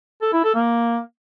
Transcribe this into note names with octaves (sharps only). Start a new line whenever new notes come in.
A4
E4
A4
A#3